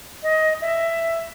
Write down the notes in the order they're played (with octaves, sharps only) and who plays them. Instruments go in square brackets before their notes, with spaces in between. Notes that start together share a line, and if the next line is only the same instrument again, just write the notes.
[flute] D#5
E5